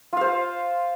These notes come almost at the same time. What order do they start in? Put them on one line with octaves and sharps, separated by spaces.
F4 F5 C5